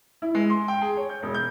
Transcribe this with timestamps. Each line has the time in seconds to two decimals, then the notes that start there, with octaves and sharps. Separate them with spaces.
0.22 E4
0.35 G#3
0.50 C6
0.68 G5
0.81 G#4
0.97 C#5
1.09 G6
1.22 E1
1.34 G6